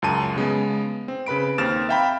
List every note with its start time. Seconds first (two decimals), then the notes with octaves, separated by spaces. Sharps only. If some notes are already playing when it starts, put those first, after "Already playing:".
0.02 C#2 F#2 A5 D#7
0.36 C#3 G#3 B3
1.08 C4
1.26 C#3 B4 B5 D7
1.58 D#2 C4 F6 A6 E7
1.89 E5 F5 G5 A#5 B5